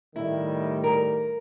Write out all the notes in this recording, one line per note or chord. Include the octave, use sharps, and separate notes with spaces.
A2 D#3 G3 E4
A#4